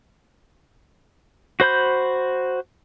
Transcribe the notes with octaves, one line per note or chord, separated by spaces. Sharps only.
F#4 C5 B5 G6